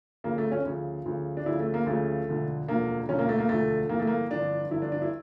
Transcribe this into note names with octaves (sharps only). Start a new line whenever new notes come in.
D2 C#3 F3 A#3
A3
C#4
D2 C#3 F3
D2 C#3 F3
D4
D2 C#3 F3 E4
A3
A#3
D2 C#3 F3 A3
E1 D2 D3 F3
E1 D2 D3 F3 A#3
E1 D2 D3 F3 C#4
A#3
A3
A#3
E1 D2 D3 F3 A3
G1 F2 E3 A#3
A3
A#3
G1 F2 E3 D4
G1 F2 E3 E4
D4
D4
E4